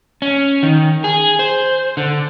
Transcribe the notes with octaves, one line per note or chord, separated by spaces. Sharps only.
C#4
D#3
G#4
C5
D3